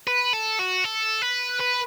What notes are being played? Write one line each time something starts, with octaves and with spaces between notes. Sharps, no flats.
B4
A4
F#4
A4
B4
B4